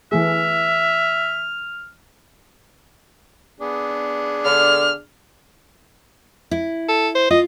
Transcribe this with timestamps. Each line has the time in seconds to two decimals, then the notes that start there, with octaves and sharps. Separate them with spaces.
0.12 E3 A3 G#4 E5 F6
3.60 B3 D4 G#4
4.45 D3 F6
6.51 E4
6.89 A4
7.15 C5
7.30 F4 D#5